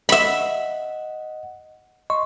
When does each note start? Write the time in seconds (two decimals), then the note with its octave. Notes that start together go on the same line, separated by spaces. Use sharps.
0.09 D#5 E5 F#5 B5
2.10 D#5 C6 C#6